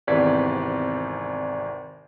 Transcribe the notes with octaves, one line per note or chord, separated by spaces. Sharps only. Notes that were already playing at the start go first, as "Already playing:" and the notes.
G#1 E2 C3 D5 G#6 B6